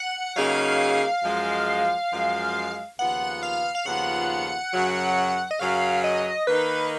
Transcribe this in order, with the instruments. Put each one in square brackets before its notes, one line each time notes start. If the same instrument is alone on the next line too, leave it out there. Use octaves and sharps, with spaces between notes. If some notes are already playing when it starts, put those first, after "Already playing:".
Already playing: [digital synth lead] F#5
[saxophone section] C#3 F#3 A#3 D#4 G#4 [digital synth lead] F5
[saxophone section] F#2 F3 G#3
F#2 F3 G#3
[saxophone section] D#2 C#3 F3 B3 F4 [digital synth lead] F#5
[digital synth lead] F5
F5
[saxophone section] D#2 C#3 F3 B3 F4 [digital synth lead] F#5
[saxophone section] F#2 C#3 F#3
[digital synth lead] D#5
[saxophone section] F#2 C#3 F#3 [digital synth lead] F5
[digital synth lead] D#5
[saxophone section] D#3 A#3 D#4 [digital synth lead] B4